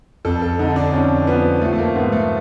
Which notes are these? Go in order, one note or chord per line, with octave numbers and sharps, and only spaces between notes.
F2 A4
A4
D3 D#4
D4
F2 C#4
F3 B3
F3 A3
A3
A#3
G#2 B3
A3